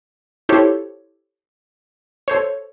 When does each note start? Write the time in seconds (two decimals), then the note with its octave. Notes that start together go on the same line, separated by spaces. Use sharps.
0.49 E4 F4 G4 A4 C5 C#5
2.28 A4 C5 C#5